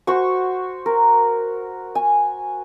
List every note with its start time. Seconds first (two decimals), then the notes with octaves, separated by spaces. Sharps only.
0.07 F#4 C5 F#5 C#6
0.86 A#4
1.95 G#5